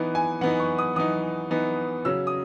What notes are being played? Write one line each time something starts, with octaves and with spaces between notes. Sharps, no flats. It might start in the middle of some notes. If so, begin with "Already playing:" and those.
Already playing: E3 B3 D#4
G#5
E3 B3 D#4 F#5
C#6
D#6
E3 B3 D#4 D#6
E3 B3 D#4
C#3 F#3 C#4 E6
D#6